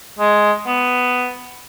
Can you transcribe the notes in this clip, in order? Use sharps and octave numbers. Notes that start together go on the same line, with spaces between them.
G#3
B3